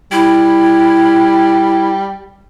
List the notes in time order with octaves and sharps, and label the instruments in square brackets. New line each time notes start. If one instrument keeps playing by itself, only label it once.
[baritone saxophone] G3 [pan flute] E4